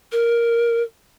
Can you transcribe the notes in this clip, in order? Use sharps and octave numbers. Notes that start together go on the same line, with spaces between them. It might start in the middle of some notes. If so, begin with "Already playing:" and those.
A#4